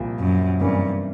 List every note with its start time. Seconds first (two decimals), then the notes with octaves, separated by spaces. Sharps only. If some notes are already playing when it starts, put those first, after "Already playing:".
Already playing: C2 A#2 F3
0.20 F#2
0.60 G2 C3 E3 G3 A#3 C#4